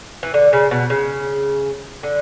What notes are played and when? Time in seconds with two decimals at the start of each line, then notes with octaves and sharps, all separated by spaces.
0.23 E3
0.34 D3
0.53 C#3
0.71 B2
0.90 C#3
2.03 D3